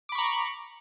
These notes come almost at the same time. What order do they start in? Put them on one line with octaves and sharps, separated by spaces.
D6 B5 C#6 A#5